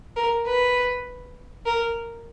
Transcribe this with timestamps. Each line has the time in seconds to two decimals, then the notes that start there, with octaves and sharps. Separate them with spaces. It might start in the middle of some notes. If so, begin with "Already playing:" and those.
0.16 A#4
0.46 B4
1.66 A#4